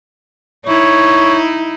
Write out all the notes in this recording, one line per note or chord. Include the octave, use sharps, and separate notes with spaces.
D#4 E4 C#5